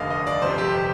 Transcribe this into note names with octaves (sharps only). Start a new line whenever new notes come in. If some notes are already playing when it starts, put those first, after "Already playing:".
Already playing: F1 D#2 D3 D#5 F5
D#5
D5
G1 F2 C3 C5
G4